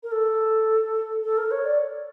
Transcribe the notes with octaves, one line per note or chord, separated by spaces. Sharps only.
A#4
A4
A4
A#4
C#5
D5